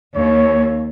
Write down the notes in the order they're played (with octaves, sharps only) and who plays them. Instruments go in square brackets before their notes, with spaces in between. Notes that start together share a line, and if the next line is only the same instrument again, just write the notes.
[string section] D#2 [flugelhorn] C#5